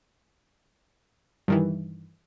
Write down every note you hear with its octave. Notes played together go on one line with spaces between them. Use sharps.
G2 D#3 E3